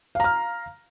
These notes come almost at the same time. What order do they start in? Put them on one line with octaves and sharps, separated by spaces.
F5 A#5 F6